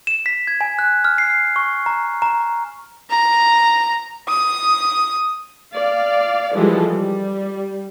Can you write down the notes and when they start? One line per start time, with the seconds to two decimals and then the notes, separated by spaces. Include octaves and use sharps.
0.07 E7
0.26 B6
0.47 G#6
0.61 G#5
0.79 F#6
1.05 F6
1.18 C7
1.56 C#6
1.86 A#5
2.22 A#5
3.11 A#5
4.28 D#6
5.76 D5 F5
6.55 E3 F3 G3 G#3 A4
6.92 G3